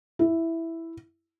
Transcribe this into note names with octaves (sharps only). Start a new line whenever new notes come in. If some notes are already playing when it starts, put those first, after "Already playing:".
E4